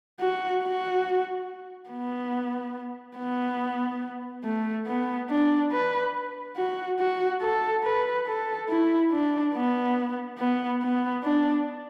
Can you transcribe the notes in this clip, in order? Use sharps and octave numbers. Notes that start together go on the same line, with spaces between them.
F#4
F#4
B3
B3
A3
B3
D4
B4
F#4
F#4
A4
B4
A4
E4
D4
B3
B3
B3
D4